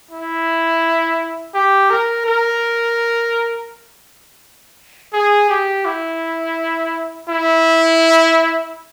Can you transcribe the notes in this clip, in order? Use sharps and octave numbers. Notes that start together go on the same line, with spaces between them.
E4
G4
A#4
A#4
G#4
G4
E4
E4